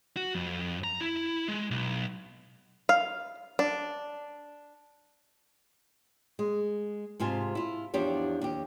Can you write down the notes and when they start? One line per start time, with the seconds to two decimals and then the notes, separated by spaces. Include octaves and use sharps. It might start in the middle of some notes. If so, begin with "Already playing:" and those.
0.17 F#4
0.35 F2
0.84 A#5
1.01 E4
1.48 G#3
1.71 B1
2.89 F5
3.59 D4
6.39 G#3
7.20 G#2 C3 F4 G#5 A5
7.55 E4 F4
7.94 E2 F3 D4 G4 C#5
8.42 D#2 G4